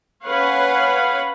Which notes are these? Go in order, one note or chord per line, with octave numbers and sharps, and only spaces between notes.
C#4 B4 C#5 F5 F#5